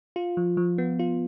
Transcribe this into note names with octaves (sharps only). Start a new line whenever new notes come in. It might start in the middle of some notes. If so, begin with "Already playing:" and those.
F4
F3
F3
B3
F4